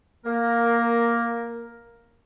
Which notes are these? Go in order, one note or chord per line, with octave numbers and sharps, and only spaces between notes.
A#3 A#4